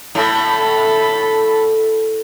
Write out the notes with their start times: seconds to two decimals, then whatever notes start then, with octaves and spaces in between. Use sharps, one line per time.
0.15 A2 A4 B5